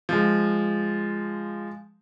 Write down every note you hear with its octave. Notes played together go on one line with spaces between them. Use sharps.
F3 G#3